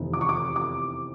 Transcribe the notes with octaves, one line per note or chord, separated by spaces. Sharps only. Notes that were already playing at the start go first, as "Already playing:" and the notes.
Already playing: F1 E2 C3 D#3
D6
C#6
D6
D6